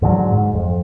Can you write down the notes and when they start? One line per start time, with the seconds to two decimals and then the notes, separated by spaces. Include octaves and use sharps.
0.02 G#2 D3 E3 F#3
0.32 G#2
0.54 F2